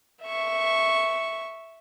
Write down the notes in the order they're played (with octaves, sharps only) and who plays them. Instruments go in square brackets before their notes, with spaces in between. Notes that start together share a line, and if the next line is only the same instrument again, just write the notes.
[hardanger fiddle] E5 C#6